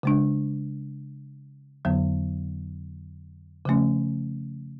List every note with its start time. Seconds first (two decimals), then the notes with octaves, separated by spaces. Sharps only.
0.03 C#3 G#3 D4
1.85 F2 D3 F#3 B3
3.65 C#3 F3 A3 C#4